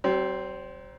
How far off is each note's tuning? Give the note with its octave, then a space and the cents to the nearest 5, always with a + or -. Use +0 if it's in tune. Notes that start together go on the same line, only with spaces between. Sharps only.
F#3 +45 C4 +0